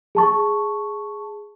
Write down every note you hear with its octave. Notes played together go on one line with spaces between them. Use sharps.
G#4 A5 C#6